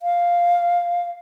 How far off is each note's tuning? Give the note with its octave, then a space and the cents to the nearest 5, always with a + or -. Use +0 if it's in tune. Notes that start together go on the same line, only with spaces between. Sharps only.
F5 +0